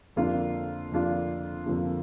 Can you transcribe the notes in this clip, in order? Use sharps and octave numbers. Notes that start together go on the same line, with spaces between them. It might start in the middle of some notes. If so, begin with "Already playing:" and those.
F2 D3 A#3 D4 F4
F2 D3 A#3 D4 F4
F2 D3 A#3 D4 F4